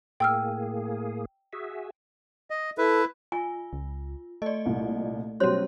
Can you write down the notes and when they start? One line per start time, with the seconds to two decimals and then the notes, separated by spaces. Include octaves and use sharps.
0.20 A2 A#3 G#4 G5 E6 F6
1.53 F#4 G#4 E5
2.50 D#5
2.78 E4 A4 B4 E5
3.32 F4 G#5
3.73 C#2
4.42 A3 D5 D#5
4.65 C2 A#2
5.40 B2 F#3 G3 C#4 C5 C#5 C6